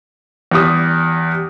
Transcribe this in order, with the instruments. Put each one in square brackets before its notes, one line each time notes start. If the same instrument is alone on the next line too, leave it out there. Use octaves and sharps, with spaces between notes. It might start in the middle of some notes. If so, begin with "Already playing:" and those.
[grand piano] E2 G3 D#6